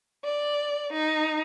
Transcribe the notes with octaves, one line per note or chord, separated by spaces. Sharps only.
D5
D#4